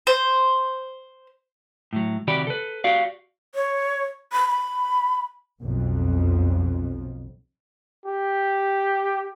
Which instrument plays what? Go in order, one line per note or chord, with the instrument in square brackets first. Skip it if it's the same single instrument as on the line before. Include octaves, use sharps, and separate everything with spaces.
[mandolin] C5
[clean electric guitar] A2 F#3
C3 D#3 F#4 G4 D5 B5
A4 B4
F#4 G4 D5 F5
[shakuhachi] C#5
B5
B5
[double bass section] B1 F2
[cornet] G4